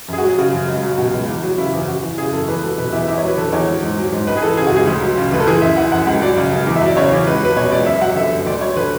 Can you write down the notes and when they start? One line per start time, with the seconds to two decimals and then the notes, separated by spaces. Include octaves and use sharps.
0.08 F#2 G#4
0.18 F#4
0.23 F#3
0.29 G#4
0.38 C#3 F#4
0.53 F#2
0.68 C#2
0.83 F#3
0.98 B2 F#4
1.13 C#2
1.28 E2
1.43 F#3
1.58 C#3 E4
1.73 E2
1.88 F#2 F#4
2.03 E3
2.18 C#3 G#4
2.33 F#2 A4
2.48 E2 B4
2.62 F#3 A4
2.78 B2 B4
2.92 E2 E5
3.08 E2 E5
3.18 C#5
3.23 F#3 B4
3.38 D3 A4
3.52 E2 C#5
3.67 F#3
3.82 G#2
3.98 F#3
4.12 G#2
4.27 C#2 B4
4.37 G#4
4.42 E3 A4
4.57 C#3 G#4
4.67 F#4
4.72 C#2 G#4
4.87 D2
5.02 F#3
5.17 C#3
5.32 D2 B4
5.40 A4
5.47 E3 G#4
5.62 F#2 E5
5.77 E3 F#5
5.92 F#2 F#5
6.07 C#2 F#5
6.22 F#3 D5
6.37 C#3
6.51 C#2
6.67 E2
6.76 E5
6.81 F#3
6.86 D5
6.97 C#3 C#5
7.12 E2
7.27 C#2 B4
7.42 F#3 B4
7.57 B2 C#5
7.71 C#2 D5
7.86 F#2 E5
8.01 F#3 F#5
8.16 D3 E5
8.32 F#2
8.46 D2 D5
8.61 F#3 C#5
8.76 D3 B4